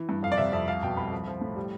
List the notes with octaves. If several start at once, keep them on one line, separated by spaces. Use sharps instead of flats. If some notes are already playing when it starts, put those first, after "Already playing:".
Already playing: E3
G2
F2 F5
D5
C3 E5
F2 E5
C2 F5
B2 G5
C2 B5
F3
F3
A2
G3